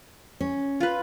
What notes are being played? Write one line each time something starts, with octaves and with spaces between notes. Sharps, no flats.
C#4
F4 B4